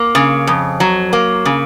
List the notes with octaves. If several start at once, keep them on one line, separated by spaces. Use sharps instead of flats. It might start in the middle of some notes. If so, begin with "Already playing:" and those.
Already playing: A#3
C#3
F2
F#3
A#3
C#3